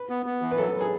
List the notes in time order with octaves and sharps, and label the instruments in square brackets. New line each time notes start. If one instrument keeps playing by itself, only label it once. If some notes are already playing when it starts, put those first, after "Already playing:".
Already playing: [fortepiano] B4
[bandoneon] B3
B3
E3
[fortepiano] B4
[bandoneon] F#3 [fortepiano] A4
[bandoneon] F#3
[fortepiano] G#4